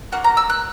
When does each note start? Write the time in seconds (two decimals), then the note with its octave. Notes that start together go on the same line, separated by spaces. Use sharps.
0.12 A#3 C#4 F#4 F#5
0.24 A#5
0.37 E6
0.50 F#6